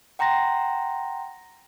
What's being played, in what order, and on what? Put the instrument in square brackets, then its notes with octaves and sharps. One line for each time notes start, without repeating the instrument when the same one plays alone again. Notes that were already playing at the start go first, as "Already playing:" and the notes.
[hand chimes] F#5 G5 A#5 C6 A#6